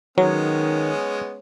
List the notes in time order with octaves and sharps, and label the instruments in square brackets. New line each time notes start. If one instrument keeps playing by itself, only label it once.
[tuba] D#3 [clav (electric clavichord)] F#3 [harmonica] G#3 B3 C#4 [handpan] C#5